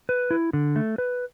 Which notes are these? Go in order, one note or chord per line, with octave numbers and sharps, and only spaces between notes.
B4
E4
D3
A3
B4